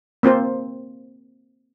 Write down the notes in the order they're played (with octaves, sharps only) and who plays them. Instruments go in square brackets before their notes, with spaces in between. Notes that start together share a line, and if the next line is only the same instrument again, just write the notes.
[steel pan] A#3 C4 F4 C5